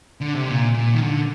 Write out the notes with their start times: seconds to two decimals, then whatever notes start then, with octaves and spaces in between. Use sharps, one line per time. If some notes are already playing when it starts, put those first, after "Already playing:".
0.21 D3
0.35 C3
0.49 A#2
0.74 A#2
0.93 D#3
1.02 D3